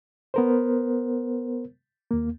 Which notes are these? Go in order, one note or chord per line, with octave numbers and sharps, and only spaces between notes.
B3 A#4 C5
D#2 A#3